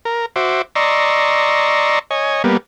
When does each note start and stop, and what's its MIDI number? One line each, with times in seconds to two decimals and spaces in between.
0.05 0.26 70
0.36 0.62 66
0.36 0.62 72
0.36 0.62 76
0.36 0.62 86
0.76 1.99 74
0.76 1.99 75
0.76 1.99 82
0.76 1.99 84
0.76 1.99 85
0.76 1.99 88
2.11 2.43 73
2.11 2.43 75
2.11 2.43 80
2.44 2.57 55
2.44 2.57 58
2.44 2.57 59